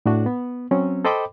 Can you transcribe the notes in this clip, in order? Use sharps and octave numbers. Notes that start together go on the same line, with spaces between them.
A2 D4 F#4
B3
F#3 C4 C#4
A4 C5 D#5 G5 B5 D6